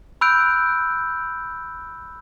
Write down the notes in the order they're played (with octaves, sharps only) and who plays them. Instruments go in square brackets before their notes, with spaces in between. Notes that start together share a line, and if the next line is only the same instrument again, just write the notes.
[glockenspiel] B5 E6 F#6 G6 D7